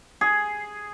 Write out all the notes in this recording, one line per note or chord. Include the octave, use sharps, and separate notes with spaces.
G#4